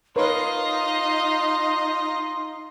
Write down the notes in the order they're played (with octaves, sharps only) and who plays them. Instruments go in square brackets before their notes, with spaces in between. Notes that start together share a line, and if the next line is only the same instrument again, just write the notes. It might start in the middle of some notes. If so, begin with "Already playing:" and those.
[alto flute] D#4 [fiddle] F4 D#5 [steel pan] A#4 B4 C#5 [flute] C6